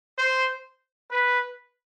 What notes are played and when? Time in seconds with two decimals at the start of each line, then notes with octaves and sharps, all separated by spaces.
0.18 C5
1.11 B4